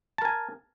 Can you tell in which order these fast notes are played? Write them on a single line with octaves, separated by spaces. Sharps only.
A5 A#4 G#5